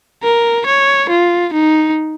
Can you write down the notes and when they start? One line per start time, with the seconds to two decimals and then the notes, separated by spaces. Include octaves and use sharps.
0.23 A#4
0.66 C#5
1.09 F4
1.53 D#4